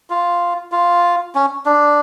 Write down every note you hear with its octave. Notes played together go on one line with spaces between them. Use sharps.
F4
F4
C#4
D4